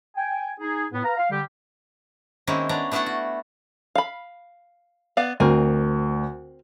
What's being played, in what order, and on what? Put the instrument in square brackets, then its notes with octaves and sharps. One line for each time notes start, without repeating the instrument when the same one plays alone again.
[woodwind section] G5 G#5
D#4 G#4
A2 B3
B4 F5 A#5
F5
D3 G3 G4
[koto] D#3 G#3 A#3 C4 C#4 E4
B3 C#4 D4 D5 A#5
A3 B3 D4 E4 A4 F#5
F#4
[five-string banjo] F5 B5
B3 D5 F5
[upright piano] D2 [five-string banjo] C4 A#4 G#5